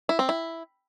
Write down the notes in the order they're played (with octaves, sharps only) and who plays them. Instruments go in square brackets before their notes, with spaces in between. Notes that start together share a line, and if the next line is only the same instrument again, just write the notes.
[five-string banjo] E4
C4
E4